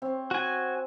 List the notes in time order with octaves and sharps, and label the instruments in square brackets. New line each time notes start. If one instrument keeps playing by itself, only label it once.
[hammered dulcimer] C4 C#5
[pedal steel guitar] F#4 G#5